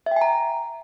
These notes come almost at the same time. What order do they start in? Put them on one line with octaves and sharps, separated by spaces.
E5 G5 G#5 A#5